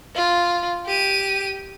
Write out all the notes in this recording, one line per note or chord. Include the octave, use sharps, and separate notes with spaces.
F4
G4 D#7